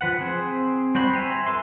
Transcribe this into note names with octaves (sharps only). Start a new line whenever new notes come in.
F3 B4 F#5
C4 G#4 C5
G3 F#4 C5 B5
E5 G#5 A#5 C6
E4 A4 B4 C6